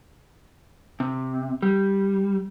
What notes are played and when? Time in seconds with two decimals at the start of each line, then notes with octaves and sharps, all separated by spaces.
1.00 C3
1.62 G3